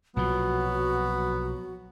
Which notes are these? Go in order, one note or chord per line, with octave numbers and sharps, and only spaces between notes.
B1 A#2 F3 F#3 B3 F#4